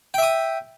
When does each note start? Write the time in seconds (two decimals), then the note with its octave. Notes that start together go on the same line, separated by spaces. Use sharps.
0.14 G5
0.18 E5
0.22 D#6